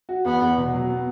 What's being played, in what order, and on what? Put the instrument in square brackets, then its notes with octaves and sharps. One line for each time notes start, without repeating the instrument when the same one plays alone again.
[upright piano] F#4
[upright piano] E2 [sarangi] B3
[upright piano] E2
B2
F#3
B3